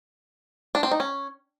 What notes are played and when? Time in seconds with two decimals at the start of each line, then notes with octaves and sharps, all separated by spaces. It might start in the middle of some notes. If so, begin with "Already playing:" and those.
0.75 D4
0.83 C4
0.91 D#4
1.00 C#4